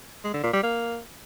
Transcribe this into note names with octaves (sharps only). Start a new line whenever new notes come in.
G#3
D3
A#2
G3
A#3